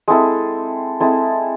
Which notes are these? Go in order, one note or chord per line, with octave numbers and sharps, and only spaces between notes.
G#3 C4 E4 A4
G#3 C4 E4 A4